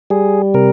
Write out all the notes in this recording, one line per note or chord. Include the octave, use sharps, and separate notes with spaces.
G3 G#4
C3 A#4